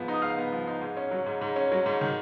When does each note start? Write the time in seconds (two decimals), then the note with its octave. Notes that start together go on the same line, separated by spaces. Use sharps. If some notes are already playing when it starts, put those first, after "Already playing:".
Already playing: G#2 F3 B3
0.08 D#4
0.14 D#6
0.22 G#2 F5 F6
0.38 B3
0.52 F3
0.67 D#4
0.81 G#2
0.97 C#4
1.11 F#3
1.26 G#2
1.41 G#2
1.56 C#4
1.72 F#3
1.86 G#2
2.01 D#3